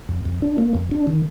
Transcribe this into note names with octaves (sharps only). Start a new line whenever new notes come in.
F2
F2
D4
A#3
F2
D4
D#3